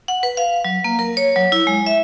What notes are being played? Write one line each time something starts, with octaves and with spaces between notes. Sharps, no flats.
F#5
B4
F5
F#3
A#3
A#4
C#5
F#3
E4
G#3
E5